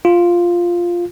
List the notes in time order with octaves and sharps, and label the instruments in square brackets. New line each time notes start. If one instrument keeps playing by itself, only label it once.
[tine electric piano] F4